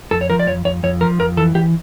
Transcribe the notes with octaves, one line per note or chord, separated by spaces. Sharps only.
F2 A4
C#5
F3 A#4
D5
F2 C#5
F2 C#5
F2 C#5
F3 A#4
F2 A#4
E3 A4
E3 G4